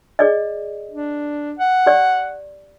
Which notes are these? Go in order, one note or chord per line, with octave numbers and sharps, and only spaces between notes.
G#4 D5 D#5
D4
F#5
G4 D5